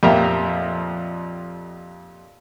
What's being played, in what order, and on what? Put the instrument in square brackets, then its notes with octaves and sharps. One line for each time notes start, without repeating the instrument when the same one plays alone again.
[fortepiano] F2 A#2 G4 A#4 E5 A#5